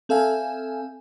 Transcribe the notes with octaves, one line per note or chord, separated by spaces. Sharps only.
C4 A4 E5 F5 G#5